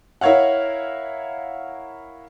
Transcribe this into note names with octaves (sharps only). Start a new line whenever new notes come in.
E4 A#4 C#5 F5 F#5